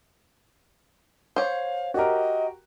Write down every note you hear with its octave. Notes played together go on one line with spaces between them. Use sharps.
C5 C#5 F5
F#4 G4 A#4 D#5